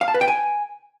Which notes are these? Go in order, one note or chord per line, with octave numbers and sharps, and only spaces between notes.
F5
A5
B4
G5
G#5